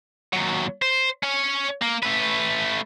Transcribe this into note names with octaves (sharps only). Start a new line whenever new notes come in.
D#2 F#3
C5
C#4 C#5
A#3
A3 B4